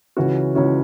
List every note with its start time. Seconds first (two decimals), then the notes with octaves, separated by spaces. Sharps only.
0.17 C#2 C#3 E3 C#4 F#4
0.55 C#2 C#3 E3 C#4 F#4